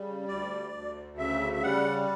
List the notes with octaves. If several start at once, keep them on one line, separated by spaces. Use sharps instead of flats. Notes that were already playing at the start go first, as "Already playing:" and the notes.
Already playing: C#3 G3
D2 D5
D2
C#3 E5
E5
G3 F#5